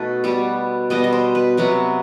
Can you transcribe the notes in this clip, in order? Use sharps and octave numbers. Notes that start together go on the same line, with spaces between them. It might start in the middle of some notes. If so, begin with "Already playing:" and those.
Already playing: B2 A3 D#4 A4 B4
B2 G3 B3
B2 G3 B3 D#5
D#5
C5
B4
C3 F#3 B3